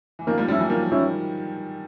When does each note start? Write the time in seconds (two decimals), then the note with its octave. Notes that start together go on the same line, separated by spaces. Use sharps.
0.19 E3
0.27 D#3 F3 A#3
0.38 F3 G3
0.48 F3 G3 C#4
0.52 E4
0.59 E3 F#3
0.69 D#3 F3 A#3
0.91 D#3 F3 C#4 E4